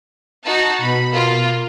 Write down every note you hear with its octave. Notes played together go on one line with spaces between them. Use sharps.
D#4 F#4 A5
B2 B5
A#3 F4